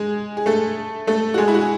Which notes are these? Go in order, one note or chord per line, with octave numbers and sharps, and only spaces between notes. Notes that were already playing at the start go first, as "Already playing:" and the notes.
Already playing: G#3 G#4
G#4
A3 A4
A3 A4
F#4
G#3 G#4
E4
F#4
G#4